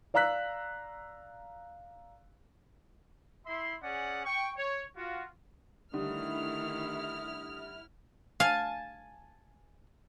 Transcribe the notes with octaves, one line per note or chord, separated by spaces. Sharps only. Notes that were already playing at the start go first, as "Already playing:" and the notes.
D5 F5 A#5 E6 F#6 B6
E4 E5 C6
C#4 G#4 D5 F#5
G5 C#6
C#5
F4 F#4
D3 D#3 G3 A3 E4 D#6 F6
F5 G#5 A5